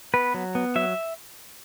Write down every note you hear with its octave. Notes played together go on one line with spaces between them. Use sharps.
B3 B4
F#3
B3
F#3 E5